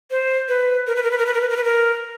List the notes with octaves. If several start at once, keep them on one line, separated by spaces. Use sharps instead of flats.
C5
B4
A#4
B4
A#4
B4
A#4
B4
A#4
B4
A#4
B4
A#4